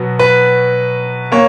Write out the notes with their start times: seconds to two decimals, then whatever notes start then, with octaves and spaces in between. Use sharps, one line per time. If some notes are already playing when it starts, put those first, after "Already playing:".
Already playing: B2 F#3 B3
0.19 B4
1.32 A#3 C#5